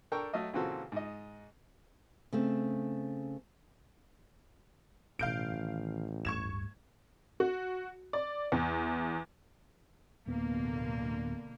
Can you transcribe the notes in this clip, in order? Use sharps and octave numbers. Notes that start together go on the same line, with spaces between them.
D4 A4 A#4 G5 C#6
F#3 A3 A4 D#5 F5
A#2 C#3 E3 C4 F#4 A4
G#2 D#5
C#3 A3 C4
A1 B2 G3 F5 G6 D7
D#3
D1 G2 C#6 G#6 E7
F#4
D5
E2
D1 B2 D3 A#3 B3